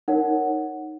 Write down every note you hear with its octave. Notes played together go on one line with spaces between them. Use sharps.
D#4 A#4 C#5 F#5